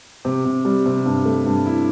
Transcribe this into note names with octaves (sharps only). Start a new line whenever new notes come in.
C3
C3
G3
C3
G2
A3
G2
E4